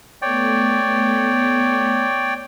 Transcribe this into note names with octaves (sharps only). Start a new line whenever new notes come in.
A3 B3 C#5 D5 G5